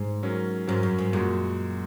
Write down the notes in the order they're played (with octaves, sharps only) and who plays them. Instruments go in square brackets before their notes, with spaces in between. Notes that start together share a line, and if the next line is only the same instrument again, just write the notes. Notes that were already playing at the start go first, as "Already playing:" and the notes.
Already playing: [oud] G#2
[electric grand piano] F#3 C#4 A#4
[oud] G#2 [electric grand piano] F#3 C#4 A#4
[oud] F#2
G#2
[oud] F#2 [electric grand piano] A#2 G#3 F#4